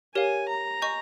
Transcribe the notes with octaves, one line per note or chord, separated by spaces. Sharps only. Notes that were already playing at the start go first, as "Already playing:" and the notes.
G4 A#4 C#5 F5 G#5
A#5
D#5 G#5 C#6 G6